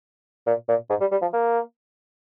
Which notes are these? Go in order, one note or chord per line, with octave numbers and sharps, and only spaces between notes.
A#2
A#2
G#2
G3
G3
F3
A#3